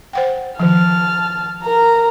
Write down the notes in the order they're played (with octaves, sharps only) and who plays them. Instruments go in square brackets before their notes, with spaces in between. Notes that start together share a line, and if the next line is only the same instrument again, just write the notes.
[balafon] C5 F#5 G5
[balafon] D#3 F3 [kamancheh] A5 F6
[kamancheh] A#4 A#5